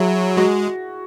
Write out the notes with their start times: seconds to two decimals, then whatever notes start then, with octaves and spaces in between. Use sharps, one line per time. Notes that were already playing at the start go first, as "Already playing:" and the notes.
Already playing: F#3 E4 G#4
0.37 G#3 F#4